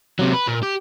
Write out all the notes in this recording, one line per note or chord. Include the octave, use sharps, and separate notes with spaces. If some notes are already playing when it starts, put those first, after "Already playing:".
C3 F#3
B4
A#2
G4